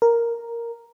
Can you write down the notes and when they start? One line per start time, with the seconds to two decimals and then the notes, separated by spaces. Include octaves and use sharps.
0.02 A#4